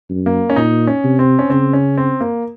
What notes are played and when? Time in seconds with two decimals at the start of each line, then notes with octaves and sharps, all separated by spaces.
0.10 F#2
0.26 A#3
0.50 C#4
0.56 A#2 D#4
0.87 C#4
1.04 C3
1.19 C4
1.39 C#4
1.50 C#3 C4
1.73 C#4
1.97 C4
2.21 A#3